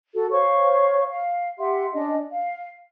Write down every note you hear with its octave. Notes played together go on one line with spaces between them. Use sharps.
F#4 A4
C5 C#5 F5 C#6
F5
G4 E5 F#5 C6
C#4 D4 D#5
F5